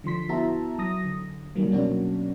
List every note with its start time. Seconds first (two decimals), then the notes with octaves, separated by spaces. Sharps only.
0.04 D3 F3 C6 B6
0.29 B3 E4 F#4 E5 A5 A#5
0.78 F#3 D#6 A#6
1.04 D3
1.55 C3 D#3 F#3 G3 A#3
1.71 B2 F#3 A#3 C#4 D4 F#4